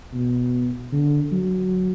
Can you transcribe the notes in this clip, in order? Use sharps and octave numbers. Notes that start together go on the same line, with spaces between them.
B2
D3
F#3